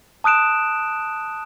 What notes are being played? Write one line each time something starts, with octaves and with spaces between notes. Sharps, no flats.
A5 D#6 F#6 D7 E7